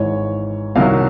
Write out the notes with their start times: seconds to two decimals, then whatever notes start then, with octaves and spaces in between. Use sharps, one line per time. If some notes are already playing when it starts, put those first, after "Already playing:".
Already playing: G#1 G#2 E3 C#5
0.75 C2 C3 D#3 F#3 F5